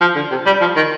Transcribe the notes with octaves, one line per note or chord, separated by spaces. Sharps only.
F3
D3
C3
G3
F3
D#3